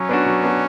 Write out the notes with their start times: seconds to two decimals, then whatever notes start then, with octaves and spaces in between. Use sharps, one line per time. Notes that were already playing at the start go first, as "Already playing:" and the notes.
Already playing: F#3 C#4
0.09 B3 D4 F#4
0.26 F#3
0.43 B3 D4 F#4